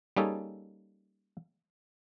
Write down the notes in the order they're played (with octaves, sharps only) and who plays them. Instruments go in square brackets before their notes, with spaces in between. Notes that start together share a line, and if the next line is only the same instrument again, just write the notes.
[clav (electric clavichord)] G3 A#3 C#4 D#4 G#4 A4